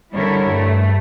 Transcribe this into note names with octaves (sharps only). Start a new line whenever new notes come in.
D3 G3 E4 A#4 C#5
G2 A3